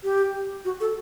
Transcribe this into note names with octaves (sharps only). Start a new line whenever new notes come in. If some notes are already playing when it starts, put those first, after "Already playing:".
G4
F#4
A4